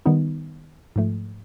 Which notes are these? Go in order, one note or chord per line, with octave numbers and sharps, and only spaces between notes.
D#3 G3 B3 D#4
G#2 F3 A3